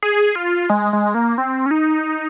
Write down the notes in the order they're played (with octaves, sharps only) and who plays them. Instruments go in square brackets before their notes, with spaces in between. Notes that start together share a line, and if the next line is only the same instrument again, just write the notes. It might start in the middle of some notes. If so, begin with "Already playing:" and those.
[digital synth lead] G#4
F4
G#3
G#3
A#3
C4
C#4
D#4